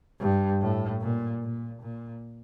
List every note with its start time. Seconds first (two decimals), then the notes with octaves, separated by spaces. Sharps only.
0.19 G2
0.60 A2
1.01 A#2
1.42 A#2
1.82 A#2